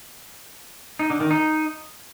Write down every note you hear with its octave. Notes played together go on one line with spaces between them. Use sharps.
D#4
D3
D#3
D#4